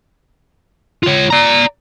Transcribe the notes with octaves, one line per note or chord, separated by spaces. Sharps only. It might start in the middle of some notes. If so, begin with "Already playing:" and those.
F4 C#5
D5 A#5